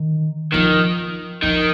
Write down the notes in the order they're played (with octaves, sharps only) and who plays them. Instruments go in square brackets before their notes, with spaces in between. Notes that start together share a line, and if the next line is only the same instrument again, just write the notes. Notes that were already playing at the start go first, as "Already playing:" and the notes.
Already playing: [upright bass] D#3
[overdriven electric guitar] D#3 [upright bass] F3
[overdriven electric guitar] D#3 [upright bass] F3